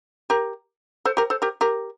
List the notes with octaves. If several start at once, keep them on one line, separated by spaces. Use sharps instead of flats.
G4 A#4
A4 C5
G4 A#4
A4 C5
G4 A#4
G4 A#4